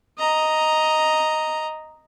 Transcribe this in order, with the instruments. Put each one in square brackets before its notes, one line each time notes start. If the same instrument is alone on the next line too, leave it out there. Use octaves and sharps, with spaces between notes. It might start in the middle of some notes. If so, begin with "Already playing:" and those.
[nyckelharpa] D#5 A#5